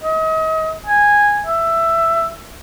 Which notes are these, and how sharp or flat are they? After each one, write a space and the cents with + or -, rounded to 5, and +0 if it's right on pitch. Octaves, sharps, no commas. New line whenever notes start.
D#5 +35
G#5 -10
E5 +10